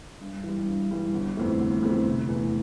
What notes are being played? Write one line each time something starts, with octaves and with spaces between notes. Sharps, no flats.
G2
E3 G3
G2
E3 G3
G1
F2 E3 A3 C4
G1
F2 E3 A3 C4
F1
E2 E3 A3